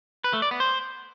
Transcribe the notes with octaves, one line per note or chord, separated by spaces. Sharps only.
B4
A3
D5
B3
C5